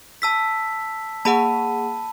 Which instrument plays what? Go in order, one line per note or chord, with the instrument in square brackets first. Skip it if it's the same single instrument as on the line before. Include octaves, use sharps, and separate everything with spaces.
[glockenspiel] A5 E6 B6
[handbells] A#3 G#4 F#5 [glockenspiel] A5 B5 D#7